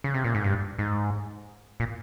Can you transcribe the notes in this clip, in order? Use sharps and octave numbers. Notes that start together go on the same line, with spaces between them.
C#3
C3
A#2
G#2
G2
G#2
A#2